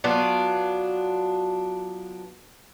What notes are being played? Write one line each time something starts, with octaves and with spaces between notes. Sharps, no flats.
F#3 B3 D4 F4